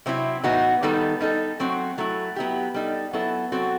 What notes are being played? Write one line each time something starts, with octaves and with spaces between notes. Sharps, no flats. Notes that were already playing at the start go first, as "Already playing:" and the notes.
C3 F#3 C4 E4
A2 E3 B3 D#4 F#4
D#3 G3 B3 D#4 A4
G3 D#4 A4
F#3 A3 C4 F#4
F#3 A3 E4
F#3 B3 E4 G4
G3 D#4 A4
F#3 B3 E4 A4
F#3 C4 F#4 A4